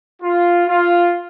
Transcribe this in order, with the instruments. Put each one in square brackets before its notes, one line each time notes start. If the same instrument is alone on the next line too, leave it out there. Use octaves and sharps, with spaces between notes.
[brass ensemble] F4
F4